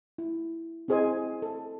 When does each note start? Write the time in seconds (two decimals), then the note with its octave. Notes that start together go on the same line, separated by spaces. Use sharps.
0.18 E4
0.88 C4 E4 G#4 C5 D#5 G#5
1.42 A4